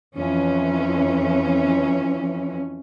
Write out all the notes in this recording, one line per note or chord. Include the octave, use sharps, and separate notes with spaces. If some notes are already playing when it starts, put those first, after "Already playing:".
F2 E3 C#4